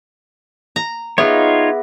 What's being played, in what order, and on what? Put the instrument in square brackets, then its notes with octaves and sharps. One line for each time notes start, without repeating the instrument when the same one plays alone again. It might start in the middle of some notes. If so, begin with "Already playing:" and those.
[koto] A#5
[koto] B3 [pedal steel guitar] D#4 F4 C#5 [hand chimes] G#4 E5